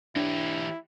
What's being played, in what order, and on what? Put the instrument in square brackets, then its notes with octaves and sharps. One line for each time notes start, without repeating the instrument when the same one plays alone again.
[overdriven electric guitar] E3 G4 [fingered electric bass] D4 [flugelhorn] E4